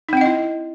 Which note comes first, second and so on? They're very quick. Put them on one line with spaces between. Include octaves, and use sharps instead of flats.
D#4 C4 F#5 D#5 E4